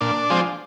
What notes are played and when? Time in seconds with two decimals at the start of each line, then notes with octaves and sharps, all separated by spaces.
0.01 A#2 D4
0.30 F3 G#3 C4